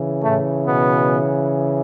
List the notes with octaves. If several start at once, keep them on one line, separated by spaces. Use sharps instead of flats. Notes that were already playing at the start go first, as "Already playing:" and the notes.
Already playing: C#3 E3
A2 A3
B2 B3